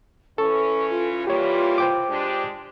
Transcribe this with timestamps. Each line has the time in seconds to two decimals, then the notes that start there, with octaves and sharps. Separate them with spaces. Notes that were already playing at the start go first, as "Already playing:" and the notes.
0.38 E3 C#4 A4 C#6
0.91 F4
1.27 E3 G3 A#3 G4 C#5
1.78 C5 G5 D6
2.09 G#3 D4 G4